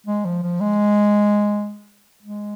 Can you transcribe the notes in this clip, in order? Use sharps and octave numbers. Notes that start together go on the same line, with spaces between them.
G#3
F3
F3
G#3
G#3